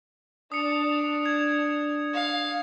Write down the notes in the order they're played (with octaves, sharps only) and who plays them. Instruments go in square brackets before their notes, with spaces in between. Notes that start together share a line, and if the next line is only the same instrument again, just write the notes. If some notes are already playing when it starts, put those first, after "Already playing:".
[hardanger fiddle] D4 [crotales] D#6 C#7
[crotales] G#6
[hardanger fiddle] F5